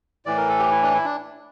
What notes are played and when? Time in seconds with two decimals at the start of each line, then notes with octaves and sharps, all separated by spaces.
0.26 A2 E3 D5
0.37 A#4
0.49 A4
0.59 G4
0.71 E4
0.82 D4
0.94 E4
1.05 D4